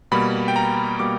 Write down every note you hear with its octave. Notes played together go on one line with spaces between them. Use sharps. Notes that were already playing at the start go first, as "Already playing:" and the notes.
B2 G3 A#3 B5
G5
A#5
B2 G3 A#3 D6